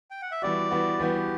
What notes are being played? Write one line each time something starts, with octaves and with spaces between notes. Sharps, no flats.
G5
F#5
E5
E3 G3 B3 F#4 D5
E3 G3 B3 F#4
E3 G3 B3 F#4 G4